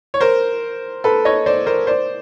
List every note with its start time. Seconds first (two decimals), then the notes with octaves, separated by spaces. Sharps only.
0.14 C#5
0.20 A#4 C5
1.04 A4 B4
1.25 C#5 D#5
1.46 C5 D5
1.66 A#4 C5
1.87 C5 D5